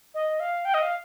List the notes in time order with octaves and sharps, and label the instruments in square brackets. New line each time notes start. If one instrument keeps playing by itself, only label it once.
[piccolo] D#5
F5
G5
D#5
F5